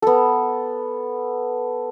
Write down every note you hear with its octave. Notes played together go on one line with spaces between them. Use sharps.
B3 A4